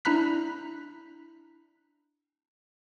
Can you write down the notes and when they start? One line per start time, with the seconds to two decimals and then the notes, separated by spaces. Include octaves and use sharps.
0.05 D4 E4 A#5 B5 F#6 B6